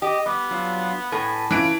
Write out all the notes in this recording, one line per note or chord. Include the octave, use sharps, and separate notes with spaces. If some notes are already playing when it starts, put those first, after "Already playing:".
G4 D#5
G3 B3
F#3 D4 F4
A2 A4 B4 G#5
E3 C#4 F4 D7